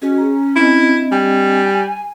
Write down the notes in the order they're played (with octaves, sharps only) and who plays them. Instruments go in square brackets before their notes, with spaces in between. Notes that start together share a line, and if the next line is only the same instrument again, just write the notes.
[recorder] C#4 [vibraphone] F#4 G#4 D#5
[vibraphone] A#5
[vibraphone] C4 D4 D#5 [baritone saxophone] E4
[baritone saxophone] G3 [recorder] G#5